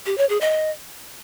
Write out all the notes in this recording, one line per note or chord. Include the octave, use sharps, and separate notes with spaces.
G4
C#5
G#4
D#5